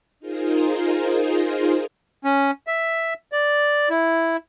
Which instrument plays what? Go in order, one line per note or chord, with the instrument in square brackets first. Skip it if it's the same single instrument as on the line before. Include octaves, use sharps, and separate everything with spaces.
[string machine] D#4 F4 G#4 A#4 C5
[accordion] C#4
E5
D5
E4